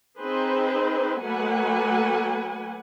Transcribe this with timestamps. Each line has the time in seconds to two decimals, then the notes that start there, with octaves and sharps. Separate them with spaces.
0.19 C4 D#4 G#4 B4 C5
1.21 F#3 A3 A#3 B4 F#5 G#5